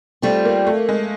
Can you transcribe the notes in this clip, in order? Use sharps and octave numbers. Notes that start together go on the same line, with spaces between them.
G3 A3 C4 F4
A#3
A3
G#3